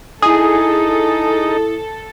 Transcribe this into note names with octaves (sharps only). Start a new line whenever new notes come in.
D#4 E4 G#4 A4 D#6